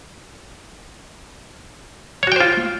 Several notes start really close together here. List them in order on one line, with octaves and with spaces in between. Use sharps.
C#5 F#4 G5 C5 F4